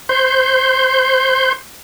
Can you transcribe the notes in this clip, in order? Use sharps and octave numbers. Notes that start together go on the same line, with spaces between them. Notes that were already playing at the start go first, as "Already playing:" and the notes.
C5 C6 G6